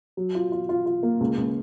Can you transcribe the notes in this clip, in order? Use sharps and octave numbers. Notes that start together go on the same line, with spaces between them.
F#3
F4
F4
F4
F4
A#3
C#2
C#2